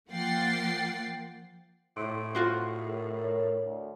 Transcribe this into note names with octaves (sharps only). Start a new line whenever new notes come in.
F3 A#3 F#5 G5 A6 C7
A2 C6 E6 D7
F4 F#4 C5
G#4 A#4
C#5
D2